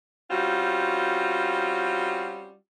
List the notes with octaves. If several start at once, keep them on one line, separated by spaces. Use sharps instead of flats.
G3 C4 C#4 F4 F#4